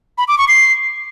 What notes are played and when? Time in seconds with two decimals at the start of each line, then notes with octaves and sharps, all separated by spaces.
0.18 B5
0.28 D6
0.38 C#6
0.48 C7